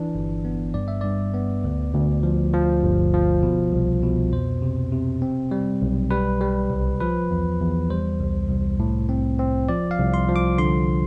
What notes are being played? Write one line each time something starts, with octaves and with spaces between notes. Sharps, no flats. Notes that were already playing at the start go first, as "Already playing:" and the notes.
Already playing: E3 D4
G1
B3
G2 D5
E5
G2 D5
B3
D2
D2
F3
F3
G1
F3
B2
C2
B2
F2 C5
C3
C3
C4
G3
B1
G3 B4
G3
C2
F3 B4
E2
E2
G3 C5
C2
C2
A2
C4
C4
F3 D5
F5
C2
C6
F3
D6
D3 C6